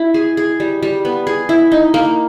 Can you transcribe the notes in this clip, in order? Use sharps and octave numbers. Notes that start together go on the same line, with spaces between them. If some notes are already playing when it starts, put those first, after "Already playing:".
Already playing: E4
G#4
G#4
G3
G3
B3
G#4
E4
D#4
A#3